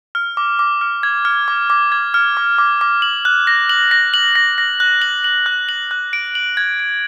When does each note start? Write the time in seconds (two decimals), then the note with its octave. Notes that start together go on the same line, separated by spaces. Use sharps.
0.15 F6
0.37 D6
0.59 D6
0.81 F6
1.03 G#6
1.25 F6
1.48 D6
1.70 D6
1.92 G#6
2.14 F6
2.37 D6
2.58 D6
2.81 D6
3.02 F#7
3.25 F#6
3.47 A#6
3.69 F#7
3.91 A#6
4.14 F#7
4.35 A#6
4.58 A#6
4.80 F#6
5.02 F#7
5.24 F#7
5.46 F#6
5.69 F#7
5.91 F#6
6.13 D7
6.35 F#7
6.57 G#6
6.80 D7